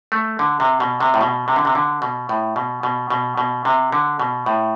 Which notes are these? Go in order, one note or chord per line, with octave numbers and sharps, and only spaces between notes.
A3
D3
C3
B2
C3
A2
B2
C3
D3
C3
D3
B2
A2
B2
B2
B2
B2
C3
D3
B2
A2